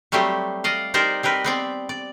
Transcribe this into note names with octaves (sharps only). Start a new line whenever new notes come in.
F#3 G3 A3 C4 G4
D5 D#5 F5
D#4 G4 A#4 C5 D5
C4 G4 A#4 B4
B3 C4 D5
D5